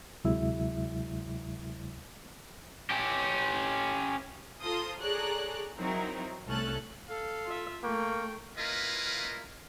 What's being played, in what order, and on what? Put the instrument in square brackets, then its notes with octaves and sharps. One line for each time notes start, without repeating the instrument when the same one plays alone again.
[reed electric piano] D2 C3 F#3 G#3 E4 E5
[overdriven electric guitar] C#4 G4
[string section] F4 A4 C5 A#5 C6 D#6
G#4 A4 C#5 D5 A#5 F#6
F#3 C4 D#4 E4 A#4
C2 A3 C#4 A4 A5 F#6
[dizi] A4 [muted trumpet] F5
[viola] F4 E5
[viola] A3 [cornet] A#3 [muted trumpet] G5 [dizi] C#6
[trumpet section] A#3 C#4 E4 F4 B4 D#5